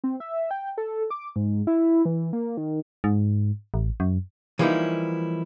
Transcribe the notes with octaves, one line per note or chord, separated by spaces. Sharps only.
C4
E5
G5
A4
D6
G#2
E4
E3
A#3
D#3
G#2
A1
F#2
E3 F3 G3 A#3 D#4 E4